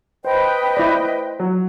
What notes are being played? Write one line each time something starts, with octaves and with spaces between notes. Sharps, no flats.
B4 C5 D#5 G5
E4 D5
F#3